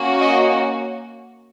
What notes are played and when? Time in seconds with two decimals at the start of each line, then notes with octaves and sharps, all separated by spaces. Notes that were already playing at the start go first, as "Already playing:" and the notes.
Already playing: A#3 C#4 F#4
0.20 D#5